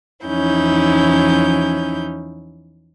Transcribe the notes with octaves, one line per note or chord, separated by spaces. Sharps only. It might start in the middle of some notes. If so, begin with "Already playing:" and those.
E2 F3 C#4 D#4 E4 G6